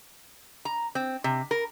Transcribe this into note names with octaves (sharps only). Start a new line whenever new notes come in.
A#5
C4
C3
A#4